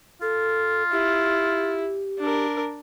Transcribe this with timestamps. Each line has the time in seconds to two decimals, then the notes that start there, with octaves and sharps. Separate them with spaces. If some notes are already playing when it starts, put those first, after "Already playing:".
0.22 F4 A4
0.92 E4 G4
2.19 D4 A#4